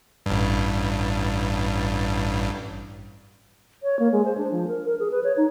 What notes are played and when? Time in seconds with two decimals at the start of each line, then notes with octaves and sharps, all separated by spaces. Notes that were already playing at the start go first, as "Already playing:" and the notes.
0.26 A1 G2
3.83 C#5
3.99 A#3
4.12 G#3
4.25 C5
4.37 D4
4.51 F3
4.67 A#4
4.85 A#4
4.99 G#4
5.11 B4
5.24 C#5
5.37 D#4